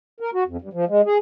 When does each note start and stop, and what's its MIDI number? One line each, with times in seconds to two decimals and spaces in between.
0.20 0.30 70
0.34 0.44 66
0.47 0.57 41
0.61 0.69 43
0.73 0.85 53
0.88 1.01 56
1.06 1.18 68